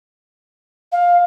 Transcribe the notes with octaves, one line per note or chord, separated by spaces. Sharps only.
F5